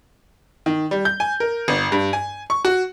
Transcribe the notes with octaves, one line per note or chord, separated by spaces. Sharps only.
D#3
G3
G6
G#5
A#4
G1
G2
G#5
C#6
F#4